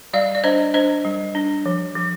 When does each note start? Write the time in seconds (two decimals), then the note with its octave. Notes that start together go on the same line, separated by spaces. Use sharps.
0.13 G3 D5 F5
0.35 D5
0.44 D4 C5 D#5
0.74 D4 C5 D#5
1.05 G3
1.35 D4
1.66 F3
1.96 F3